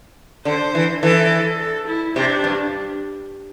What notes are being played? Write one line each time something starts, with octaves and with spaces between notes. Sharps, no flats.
D3 C5
E3
E3 A4
A4
E4
C3 D4
G2